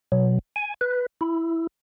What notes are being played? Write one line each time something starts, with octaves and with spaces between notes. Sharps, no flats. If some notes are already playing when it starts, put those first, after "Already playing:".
B2 F#3
G#5
B4
E4